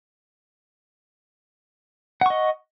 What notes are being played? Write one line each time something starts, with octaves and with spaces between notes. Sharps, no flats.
D#5 F#5 C#6